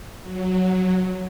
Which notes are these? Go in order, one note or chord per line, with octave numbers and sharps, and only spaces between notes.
F#3